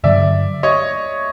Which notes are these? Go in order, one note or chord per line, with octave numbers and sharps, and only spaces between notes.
G2 D3 F#3 D5 E5
C#5 D#5